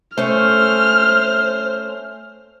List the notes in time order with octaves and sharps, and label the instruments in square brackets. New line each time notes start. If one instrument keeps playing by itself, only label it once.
[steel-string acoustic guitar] A3 C#4 [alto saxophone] C5 [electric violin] F6